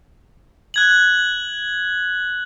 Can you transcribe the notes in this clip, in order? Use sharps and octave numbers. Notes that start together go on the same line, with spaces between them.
F#6 G#6 F#7